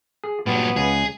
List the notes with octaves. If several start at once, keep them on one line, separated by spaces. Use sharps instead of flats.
G#4
G2 A#2 F#3 B3
C#2 G#4